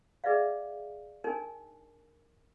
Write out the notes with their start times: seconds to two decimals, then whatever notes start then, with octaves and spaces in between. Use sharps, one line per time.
0.24 G#4 B4 D5 E5 F5
1.24 D4 D#4 A#4 G#5